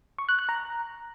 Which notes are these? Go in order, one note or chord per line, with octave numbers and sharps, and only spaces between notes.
C#6
F#6
F#6
A#5